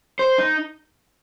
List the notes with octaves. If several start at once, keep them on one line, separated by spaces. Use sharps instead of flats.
C5
D#4